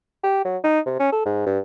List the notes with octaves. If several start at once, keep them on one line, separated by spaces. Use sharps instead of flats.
G4
F#3
D#4
C3
C#4
A4
G#2
G2